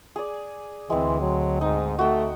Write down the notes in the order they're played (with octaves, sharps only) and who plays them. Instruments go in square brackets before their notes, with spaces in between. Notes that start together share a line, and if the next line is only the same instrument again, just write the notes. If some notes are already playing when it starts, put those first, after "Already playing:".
[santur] G#4 D5
[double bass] D2 [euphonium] E3 [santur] G#3 C4
[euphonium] F#3
[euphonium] G#2 [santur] D#4
[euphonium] A3 [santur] F#4 G5